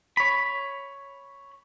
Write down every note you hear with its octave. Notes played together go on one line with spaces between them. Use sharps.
C#5 B5